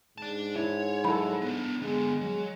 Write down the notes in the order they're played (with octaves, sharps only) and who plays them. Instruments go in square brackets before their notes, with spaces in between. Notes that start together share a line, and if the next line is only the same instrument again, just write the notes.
[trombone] G#2 [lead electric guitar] D5 A5
[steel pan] E4 [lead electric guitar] C#5
[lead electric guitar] F#3 [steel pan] E4 A4 [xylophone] B5
[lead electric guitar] B3 D4
[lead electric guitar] D3 B3 [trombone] G#3
[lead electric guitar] F#3 [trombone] G#3